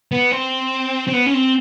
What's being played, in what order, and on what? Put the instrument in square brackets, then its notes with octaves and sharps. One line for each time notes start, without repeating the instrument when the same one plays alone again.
[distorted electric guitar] B3
C4
C4
B3
C#4
C4